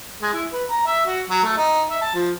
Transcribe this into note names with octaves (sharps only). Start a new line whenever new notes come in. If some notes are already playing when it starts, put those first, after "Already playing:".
G#3
E4
B4
A#5
E5
F#4
F#3
A3
D#4
E5
A5
F3